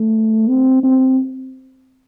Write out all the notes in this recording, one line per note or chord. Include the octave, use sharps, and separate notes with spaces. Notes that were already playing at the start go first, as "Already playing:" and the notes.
Already playing: A3
C4
C4